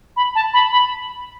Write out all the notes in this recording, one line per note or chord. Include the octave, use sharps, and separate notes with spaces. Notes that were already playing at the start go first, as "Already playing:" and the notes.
B5
A5
B5
B5